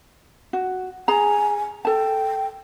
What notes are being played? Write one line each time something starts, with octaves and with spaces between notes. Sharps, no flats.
F#4
G#4 G#5 A#5
A4 G5 A5